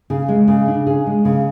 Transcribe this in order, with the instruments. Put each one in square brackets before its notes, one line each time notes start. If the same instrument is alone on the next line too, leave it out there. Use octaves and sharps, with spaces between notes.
[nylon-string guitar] C#3 G#4
G#3
C#3 G#4
D4
C#3 G#4
G#3
C#3